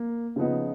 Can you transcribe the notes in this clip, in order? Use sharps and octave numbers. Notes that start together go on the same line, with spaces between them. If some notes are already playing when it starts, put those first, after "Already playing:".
Already playing: A#3
C#3 F3 B3 D#4